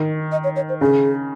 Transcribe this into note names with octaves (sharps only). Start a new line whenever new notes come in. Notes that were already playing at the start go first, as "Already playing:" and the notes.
Already playing: D#3
D#5
C#5
C#5
C5
C#3 G#4